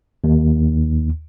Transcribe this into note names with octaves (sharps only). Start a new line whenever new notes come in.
D#2